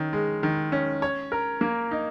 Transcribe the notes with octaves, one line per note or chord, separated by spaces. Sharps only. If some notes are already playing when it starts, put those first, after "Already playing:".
Already playing: D#3 C#4
G#3
D#3
C#4
C#5
A#4
A#3
D#4